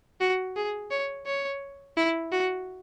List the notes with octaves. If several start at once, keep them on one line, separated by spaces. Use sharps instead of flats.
F#4
G#4
C#5
C#5
E4
F#4